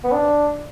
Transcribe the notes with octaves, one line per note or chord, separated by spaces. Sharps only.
B3
D4